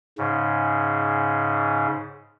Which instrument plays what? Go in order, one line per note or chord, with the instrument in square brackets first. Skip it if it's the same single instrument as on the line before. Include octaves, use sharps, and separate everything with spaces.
[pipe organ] G#2 C#3